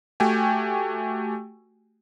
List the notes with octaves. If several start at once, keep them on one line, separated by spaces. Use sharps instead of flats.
A3 F#4 G4 G5 G#5